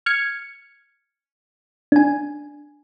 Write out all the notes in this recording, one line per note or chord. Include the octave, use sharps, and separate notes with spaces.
F6 G#6 C#7
D4 G#5